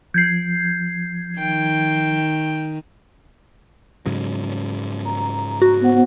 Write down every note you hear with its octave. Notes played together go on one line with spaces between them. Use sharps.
F3 G6 G#6 C7
D#3 G5
G#2 C#3 F#3
A#5
F#4
B3 C5 F#5